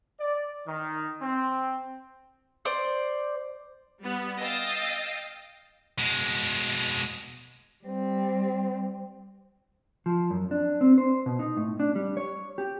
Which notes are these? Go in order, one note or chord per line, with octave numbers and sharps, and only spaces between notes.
D5
D#3
C4
C5 D5
G3 B3
D#5 F5 G5 E6 A6 C7
B2 G#3
G3 C4
F3
F#2
D4
C4
C5
B2
D#4
A2
D4
G3
C#5
G4